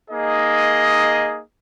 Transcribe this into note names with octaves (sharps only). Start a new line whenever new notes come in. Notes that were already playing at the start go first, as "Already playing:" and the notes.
A#3 D#4 G#4 D#5